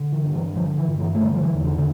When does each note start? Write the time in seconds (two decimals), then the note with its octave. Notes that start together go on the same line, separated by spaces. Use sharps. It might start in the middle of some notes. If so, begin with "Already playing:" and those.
Already playing: D3
0.12 E3
0.24 G2
0.34 E3
0.56 D3 F3
0.78 E3
0.88 G2
0.99 E3
1.15 A3
1.21 D3 G3
1.35 F3
1.43 E3
1.54 E2
1.64 D3
1.78 D3